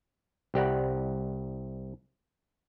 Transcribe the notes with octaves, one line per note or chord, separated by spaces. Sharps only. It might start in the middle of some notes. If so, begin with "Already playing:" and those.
C2 G4 D5 F#5